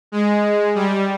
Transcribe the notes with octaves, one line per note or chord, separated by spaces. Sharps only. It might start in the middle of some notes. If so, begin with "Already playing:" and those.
G#3
G3